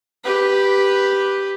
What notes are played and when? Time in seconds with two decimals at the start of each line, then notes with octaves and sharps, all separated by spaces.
0.24 G4 B4